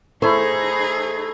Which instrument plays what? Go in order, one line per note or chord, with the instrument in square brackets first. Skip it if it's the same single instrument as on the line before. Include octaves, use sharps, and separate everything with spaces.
[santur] A3 E4 [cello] D#4 G#4 [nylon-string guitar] C5